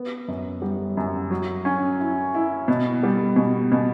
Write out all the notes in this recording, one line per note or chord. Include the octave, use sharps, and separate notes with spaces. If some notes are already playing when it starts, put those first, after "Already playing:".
Already playing: B3
F#2
G3
F#2
F#3
C#4
E4
E4
B2
G3
B2
B2